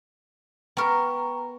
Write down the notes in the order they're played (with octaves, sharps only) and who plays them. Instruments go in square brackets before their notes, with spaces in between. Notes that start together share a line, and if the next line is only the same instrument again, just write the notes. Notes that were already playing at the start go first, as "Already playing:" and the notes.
[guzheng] B3 A#4 [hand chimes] G5 A#5 C#6